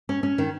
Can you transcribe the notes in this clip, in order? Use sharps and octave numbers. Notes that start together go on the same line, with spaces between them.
C#4
C#4
D#3